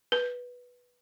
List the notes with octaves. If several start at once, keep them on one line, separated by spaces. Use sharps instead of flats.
B4